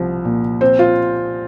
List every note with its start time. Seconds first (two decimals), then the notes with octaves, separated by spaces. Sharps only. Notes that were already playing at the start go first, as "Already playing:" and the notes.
Already playing: C2 F3
0.25 A#2
0.61 C4 C5
0.79 F4